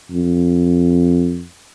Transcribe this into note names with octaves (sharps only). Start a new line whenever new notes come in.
F2